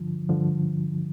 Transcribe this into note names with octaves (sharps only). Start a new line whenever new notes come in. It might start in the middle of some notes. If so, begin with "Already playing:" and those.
Already playing: G2 D3 F3
G2 D3 F3